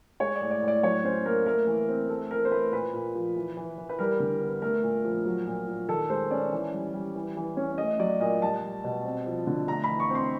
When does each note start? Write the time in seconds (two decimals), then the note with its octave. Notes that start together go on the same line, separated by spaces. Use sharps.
0.20 G#3 C#5
0.36 D5
0.41 A2
0.51 D5
0.62 A2
0.68 D5
0.83 F#3 C#5
1.04 C#4 C5
1.25 A#3 A#4
1.46 A3 A#4
1.67 E3
1.88 C4
2.09 A3 A4
2.31 E3 A#4
2.45 C5
2.52 A3 B4
2.73 A#2 B4
2.94 A#2
3.15 F3
3.36 E3
3.57 E3
3.78 E3
3.89 B4
3.99 G3 A#4
4.20 D3
4.41 B3
4.62 A3 A#4
4.83 A#2
5.05 F3
5.26 F#3
5.46 A#2
5.68 A#2
5.89 D#3 A4
6.10 G#3 C5
6.31 C#4 D5
6.52 E3
6.73 G3
6.93 G3
7.15 E3
7.37 E3
7.57 C#4
7.78 A3 D#5
7.99 F#3 D5
8.20 A#2 D#5
8.42 G3 A5
8.62 G3
8.84 B2
9.05 C4
9.26 F3
9.47 D3
9.67 A3 A#5
9.84 B5
9.89 E3
10.00 C#6
10.10 C4 C6